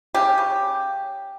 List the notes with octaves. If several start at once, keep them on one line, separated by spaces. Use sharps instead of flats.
C#3 G4
C#3